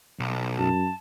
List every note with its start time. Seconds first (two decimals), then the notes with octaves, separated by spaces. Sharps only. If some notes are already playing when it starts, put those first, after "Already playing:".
0.20 B1
0.58 F#2 A5